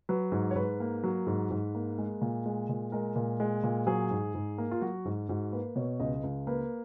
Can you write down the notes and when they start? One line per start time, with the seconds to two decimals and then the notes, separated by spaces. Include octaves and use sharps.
0.09 F#3 B4
0.32 G#2
0.51 C#5
0.55 G#2 B4
0.80 A#3
1.04 F#3
1.27 G#2
1.51 G#2
1.75 A#3
1.98 G#3
2.22 A#2
2.46 G#3
2.69 A#2
2.92 G#3 A#4
3.16 A#2
3.40 G#3
3.64 A#2
3.87 F#3 G#4
4.11 G#2
4.35 G#2
4.58 A#3
4.71 F4
4.81 F#3 F#4
5.05 G#2
5.29 G#2 F#4
5.52 A#3 B4
5.76 B2 C#5
6.00 C#2 D#5
6.24 C#2
6.47 A#3 B4